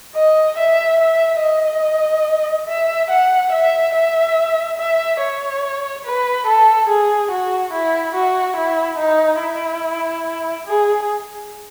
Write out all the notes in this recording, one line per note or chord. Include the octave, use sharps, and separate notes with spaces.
D#5
E5
E5
D#5
E5
F#5
E5
E5
E5
C#5
B4
A4
G#4
F#4
E4
F#4
E4
D#4
E4
G#4